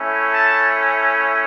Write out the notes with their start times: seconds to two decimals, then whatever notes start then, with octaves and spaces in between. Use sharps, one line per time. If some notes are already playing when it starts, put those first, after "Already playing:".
Already playing: A3 C#4 E4
0.33 A5